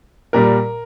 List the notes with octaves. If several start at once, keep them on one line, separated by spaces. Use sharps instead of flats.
A#2 G3 A#4